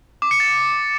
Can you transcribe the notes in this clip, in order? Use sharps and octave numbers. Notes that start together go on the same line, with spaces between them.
D6
C#7
A6